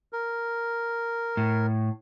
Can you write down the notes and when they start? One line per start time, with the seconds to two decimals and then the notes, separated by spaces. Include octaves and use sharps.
0.13 A#4
1.37 A2